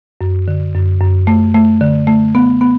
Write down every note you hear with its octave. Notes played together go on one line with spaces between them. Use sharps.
F#2
D3
F#2
F#2
A3
A3
D3
A3
B3
B3